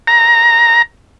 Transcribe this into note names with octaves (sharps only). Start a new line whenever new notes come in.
A#5